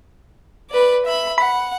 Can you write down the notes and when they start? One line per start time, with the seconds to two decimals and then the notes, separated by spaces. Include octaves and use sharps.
0.70 B4 D5
1.05 E5 B5
1.38 F#5 B5